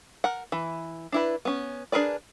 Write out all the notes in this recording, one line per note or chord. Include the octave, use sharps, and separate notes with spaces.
A#4 F#5
E3
D4 E4 B4
B3 C#4
D4 G#4 A#4 B4 D5